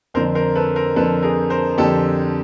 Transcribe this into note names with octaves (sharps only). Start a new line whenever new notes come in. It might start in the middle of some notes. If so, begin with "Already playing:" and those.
F2 D3 A#4 C5
A#4 C5
A4 B4
A#4 C5
F2 D3 A4 B4
G#4 A#4
A#4 C5
F2 D3 G4 A4